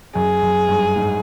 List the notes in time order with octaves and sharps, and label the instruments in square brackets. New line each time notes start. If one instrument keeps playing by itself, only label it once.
[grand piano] F#2 [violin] G#4
[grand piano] F#2
G2
G#2